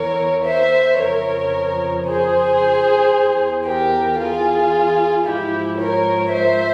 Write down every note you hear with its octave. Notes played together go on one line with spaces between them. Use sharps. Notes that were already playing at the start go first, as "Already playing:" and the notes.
Already playing: E2 E3 A#4 C#5
C5 E5
F2 C#3 F3 A#4 C#5
G#4 C5
E2 E3
G4 A#4
F4 G#4
G#2 F3 E4 G4
A#4 C#5
C5 E5